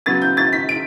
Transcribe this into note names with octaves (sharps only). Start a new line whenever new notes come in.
C#3 F#3 B3 A6
G6
A6
B6
D7